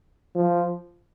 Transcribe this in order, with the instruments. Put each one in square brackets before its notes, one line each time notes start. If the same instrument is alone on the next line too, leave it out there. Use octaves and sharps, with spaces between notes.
[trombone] F3